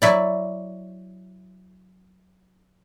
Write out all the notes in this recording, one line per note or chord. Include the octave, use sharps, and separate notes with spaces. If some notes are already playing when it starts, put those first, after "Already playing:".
F#3 E4 D5